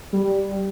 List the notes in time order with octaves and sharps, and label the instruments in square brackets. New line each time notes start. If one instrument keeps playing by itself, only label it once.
[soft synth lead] G3